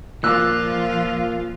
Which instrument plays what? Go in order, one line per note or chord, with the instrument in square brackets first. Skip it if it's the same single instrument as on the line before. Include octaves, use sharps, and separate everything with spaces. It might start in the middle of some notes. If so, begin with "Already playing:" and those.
[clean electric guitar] A#2 [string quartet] F3 F4 [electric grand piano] D6 E6 [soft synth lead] F#6